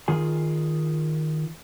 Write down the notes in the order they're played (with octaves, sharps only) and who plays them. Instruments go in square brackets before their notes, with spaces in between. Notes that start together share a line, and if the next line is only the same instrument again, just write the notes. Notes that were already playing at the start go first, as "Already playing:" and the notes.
[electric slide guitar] D#3 F4 G#4 G#5